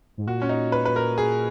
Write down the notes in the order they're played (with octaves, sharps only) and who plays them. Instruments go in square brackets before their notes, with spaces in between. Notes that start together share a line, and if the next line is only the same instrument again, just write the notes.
[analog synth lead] G#2
[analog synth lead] A#2 [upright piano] F#4
[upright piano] C#4
D#4
B4
B4
A#4
G#4